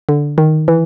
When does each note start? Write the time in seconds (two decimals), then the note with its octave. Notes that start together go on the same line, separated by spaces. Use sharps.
0.09 D3
0.38 D#3
0.68 E3